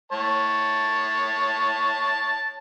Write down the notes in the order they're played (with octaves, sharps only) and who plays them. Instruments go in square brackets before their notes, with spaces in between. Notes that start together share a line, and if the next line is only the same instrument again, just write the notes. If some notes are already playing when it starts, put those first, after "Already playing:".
[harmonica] C#5 A5